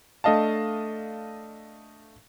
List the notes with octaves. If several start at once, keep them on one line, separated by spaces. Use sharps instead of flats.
A3 D4 D#5 F5 A5